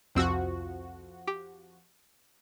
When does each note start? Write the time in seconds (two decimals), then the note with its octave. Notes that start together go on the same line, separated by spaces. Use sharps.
0.15 C2 F2 F3 C4 F#4 E6
1.27 G4